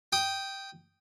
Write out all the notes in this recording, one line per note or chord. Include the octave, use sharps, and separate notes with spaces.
G5 D#6